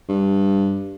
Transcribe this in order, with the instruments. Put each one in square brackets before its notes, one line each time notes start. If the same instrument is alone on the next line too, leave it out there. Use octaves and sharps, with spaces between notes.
[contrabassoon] G2